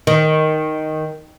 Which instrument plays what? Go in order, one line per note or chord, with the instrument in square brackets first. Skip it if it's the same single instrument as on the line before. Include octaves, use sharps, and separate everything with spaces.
[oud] D#3